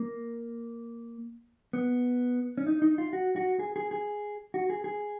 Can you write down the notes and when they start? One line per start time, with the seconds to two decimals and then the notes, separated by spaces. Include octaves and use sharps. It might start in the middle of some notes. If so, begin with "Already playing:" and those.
Already playing: A#3
1.73 B3
2.58 C#4
2.67 D#4
2.82 D#4
2.98 F4
3.13 F#4
3.36 F#4
3.59 G#4
3.76 G#4
3.91 G#4
4.54 F#4
4.70 G#4
4.84 G#4